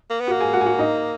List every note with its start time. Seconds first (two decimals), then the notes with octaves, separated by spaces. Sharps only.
0.10 A#3
0.21 B3
0.27 A#3 F#4 F#5
0.40 G#4 G#5
0.53 F#4 F#5
0.61 G#5
0.66 F#4 F#5
0.79 D#4 D#5